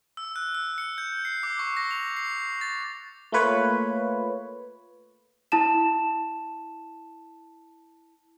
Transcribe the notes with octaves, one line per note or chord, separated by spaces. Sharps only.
E6
F#6
E6
C#7
G6
C7
D6
C#6
A#6
F7
C7
A6
A3 A#3 F4 B4 C#5
E4 A5 E7